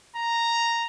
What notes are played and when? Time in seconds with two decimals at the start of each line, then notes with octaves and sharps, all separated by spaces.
0.16 A#5